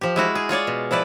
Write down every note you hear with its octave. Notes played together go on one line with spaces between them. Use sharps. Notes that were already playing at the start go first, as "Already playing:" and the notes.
F3 G4
G#3 E4 F#4 F5
G#4
F4 G#4 C#5 D5
B2
F3 E4 B4 D5